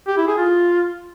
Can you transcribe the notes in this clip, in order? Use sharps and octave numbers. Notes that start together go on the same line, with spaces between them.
G4
E4
G#4
F4